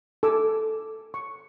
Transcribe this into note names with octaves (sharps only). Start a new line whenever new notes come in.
A4 G#5 D6 E6
C#6